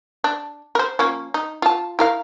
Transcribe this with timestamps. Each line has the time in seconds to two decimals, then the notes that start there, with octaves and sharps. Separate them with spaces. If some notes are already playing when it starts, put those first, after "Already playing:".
0.24 D4
0.75 A#4 C5
0.99 F3 A#3 C#4
1.34 D#4
1.62 F4 A5
1.99 E4 A#4 F5